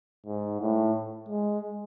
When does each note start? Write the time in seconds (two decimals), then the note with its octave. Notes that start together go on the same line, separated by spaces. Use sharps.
0.26 G#2
0.61 A2
1.29 G#3